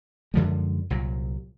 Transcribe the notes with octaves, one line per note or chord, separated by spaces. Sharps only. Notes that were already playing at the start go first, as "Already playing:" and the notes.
F#2 D3 F3 G#3
C2 A#2 F#3